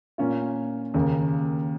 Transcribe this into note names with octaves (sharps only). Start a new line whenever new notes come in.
A#2 A#3 C#4 F4
D#2 C#3 A#3